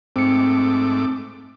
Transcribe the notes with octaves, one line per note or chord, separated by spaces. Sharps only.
G#2 A3 C4 D6 C#7